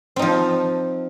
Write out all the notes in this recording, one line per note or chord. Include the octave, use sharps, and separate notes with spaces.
F3 C4 D#4